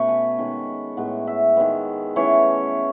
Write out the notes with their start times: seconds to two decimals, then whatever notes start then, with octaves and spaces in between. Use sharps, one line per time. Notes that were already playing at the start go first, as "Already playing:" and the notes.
Already playing: B2 A3 C#4 B5 C#6
0.08 G#5
0.38 D#3 G#3 C#4
0.97 A2 G#3 B3 F#5
1.27 E5
1.57 D#3 G#3 B3
2.16 E3 A3 C#4 C#5